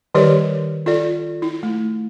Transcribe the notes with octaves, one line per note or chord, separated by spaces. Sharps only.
D#3 G3 G4 A#4 C#5 D5
F4 A4 D5
E4
A3